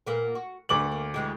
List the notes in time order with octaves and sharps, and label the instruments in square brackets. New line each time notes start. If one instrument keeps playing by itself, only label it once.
[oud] A#2 A#3 B3
F#4
[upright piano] D2 D6 F#7 [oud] B3 D4 B4
[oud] A#3
E3 G#3 G4